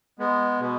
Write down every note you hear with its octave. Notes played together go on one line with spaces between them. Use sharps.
G#3 B3
B2